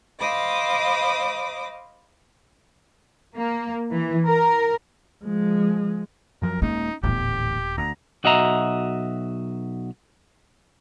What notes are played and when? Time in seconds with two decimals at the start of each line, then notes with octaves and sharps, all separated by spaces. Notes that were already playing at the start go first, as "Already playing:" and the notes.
0.19 C5 D#5 F5 B5 D6 D#6
3.35 A#3
3.92 E3
4.26 A#4
5.25 F3 G#3
6.42 F#2 F3 F#3 A#4
6.62 D#1 G#3 A#3 C#4 D#4
7.04 D#1 A1 D2 A2 B3 G4
7.78 D2 A#5
8.24 B1 F#4 D#5 E5 A#5